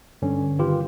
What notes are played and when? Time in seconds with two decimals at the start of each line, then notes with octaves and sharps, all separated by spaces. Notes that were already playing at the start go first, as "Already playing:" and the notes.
0.22 G2 D3 C#4
0.59 D#3 F4 G4 B4